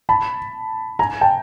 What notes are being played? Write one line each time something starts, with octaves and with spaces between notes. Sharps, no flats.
A5 B5
G#5 A#5
G5 A5